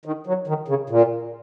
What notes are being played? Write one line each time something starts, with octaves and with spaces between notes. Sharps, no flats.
D#3
F#3
D#3
C#3
A#2